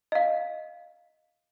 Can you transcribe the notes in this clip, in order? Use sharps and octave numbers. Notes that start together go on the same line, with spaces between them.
D#5 F5